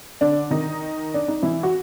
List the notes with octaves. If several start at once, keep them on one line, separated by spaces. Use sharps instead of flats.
D3 D4
D#3 D#4
D4
D#4
E3 E4
F#4